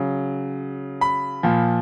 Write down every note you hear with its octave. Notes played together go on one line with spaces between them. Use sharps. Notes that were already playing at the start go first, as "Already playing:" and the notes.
Already playing: C#3 F#3
B5
A#2 F3